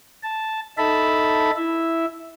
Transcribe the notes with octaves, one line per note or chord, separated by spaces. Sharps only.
A5
D#4 A4 E5 A5 B5
E4 E5